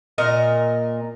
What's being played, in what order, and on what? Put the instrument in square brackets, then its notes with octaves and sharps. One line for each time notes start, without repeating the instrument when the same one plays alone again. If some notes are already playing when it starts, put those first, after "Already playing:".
[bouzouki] A#2 A#4 D#5